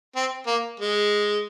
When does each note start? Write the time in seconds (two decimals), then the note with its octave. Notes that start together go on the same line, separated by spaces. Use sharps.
0.16 C4
0.47 A#3
0.80 G#3